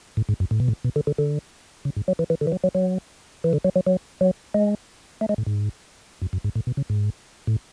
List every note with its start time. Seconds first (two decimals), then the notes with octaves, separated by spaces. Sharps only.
0.17 A2
0.29 G#2
0.40 F#2
0.51 A2
0.60 B2
0.68 A2
0.84 B2
0.96 D3
1.07 D3
1.18 D3
1.85 C#3
1.96 G#2
2.08 F#3
2.19 E3
2.30 E3
2.41 D3
2.47 E3
2.52 F#3
2.64 F#3
2.75 F#3
3.44 E3
3.53 D3
3.65 F#3
3.76 F#3
3.87 F#3
4.21 F#3
4.54 G#3
5.21 A3
5.29 G#3
5.38 A2
5.46 G#2
6.22 F#2
6.33 F#2
6.44 G#2
6.56 A2
6.67 B2
6.77 C#3
6.90 G#2
7.47 A2